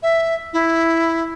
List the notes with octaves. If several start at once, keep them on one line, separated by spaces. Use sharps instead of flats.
E5
E4